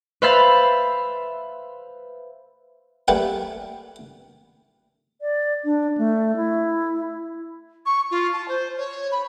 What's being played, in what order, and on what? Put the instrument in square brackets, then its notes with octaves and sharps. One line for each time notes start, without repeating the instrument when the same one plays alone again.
[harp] B4 C5 E5 F5 B5 A6
[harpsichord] G3 A3 A#3 B4 F#5 G5
[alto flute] D5
D4
A3
E4
[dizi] C#6
F4
A5
C5
C#5
B5